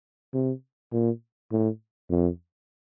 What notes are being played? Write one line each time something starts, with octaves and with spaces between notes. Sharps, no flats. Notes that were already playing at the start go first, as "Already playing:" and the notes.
C3
A#2
A2
F2